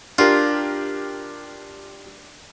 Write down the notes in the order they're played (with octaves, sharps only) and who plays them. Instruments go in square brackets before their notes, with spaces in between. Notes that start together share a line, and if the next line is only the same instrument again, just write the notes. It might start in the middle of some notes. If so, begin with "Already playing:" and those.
[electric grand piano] D4 G4 A#4 [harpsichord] F4